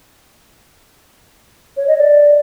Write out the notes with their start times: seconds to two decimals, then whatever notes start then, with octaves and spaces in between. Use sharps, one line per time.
1.76 C#5
1.87 D#5
1.98 D5